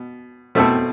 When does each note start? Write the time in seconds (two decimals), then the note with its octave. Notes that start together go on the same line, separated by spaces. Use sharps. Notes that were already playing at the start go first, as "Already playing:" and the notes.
Already playing: B2
0.55 B2 A3 C4 E4 A4